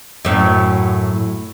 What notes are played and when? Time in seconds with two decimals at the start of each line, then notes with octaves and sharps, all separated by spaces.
0.25 F#2 A2